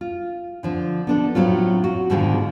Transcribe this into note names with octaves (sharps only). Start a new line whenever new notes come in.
F4
D3 F3 C4
B3 D4 A4
A2 F#3 C4 F4
F#4
G#2 B2 D3 D#3 F4 G#4